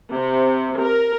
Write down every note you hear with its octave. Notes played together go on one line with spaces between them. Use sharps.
C3
A#4